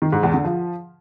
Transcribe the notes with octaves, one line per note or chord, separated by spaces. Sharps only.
D#3
G#2
E2
D3
F3